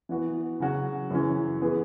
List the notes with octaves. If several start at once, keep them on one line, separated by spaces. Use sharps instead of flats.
E3 B3 F#4
C#3 F#3 C#4 F#4
F#2 C#3 E3 C#4
E3 B3 G#4